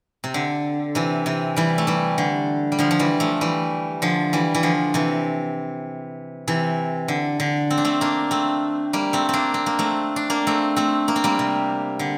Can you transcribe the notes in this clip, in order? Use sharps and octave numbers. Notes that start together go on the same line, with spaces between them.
C3
D3
C3 E3
C3 E3
E3 G3
A3
E3 G3
D3
G3
D3 F3
F3
E3 G3
F3 A3
E3 G3
D3 F3
E3 G3
E3
D3 F3
C3 E3
C3 E3
D3
D3
C4
D4
A3 C4
A#3 D4
A3 C4
G3 A#3
A3 C4
A#3 C4 D4
C4
A#3
A3 C4
D4
A#3 D4
A3 C4
A3 C4
A#3
C4
G3 A#3
C3
D3